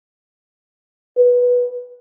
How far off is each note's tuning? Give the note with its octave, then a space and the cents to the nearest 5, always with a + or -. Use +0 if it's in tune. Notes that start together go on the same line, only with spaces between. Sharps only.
B4 -10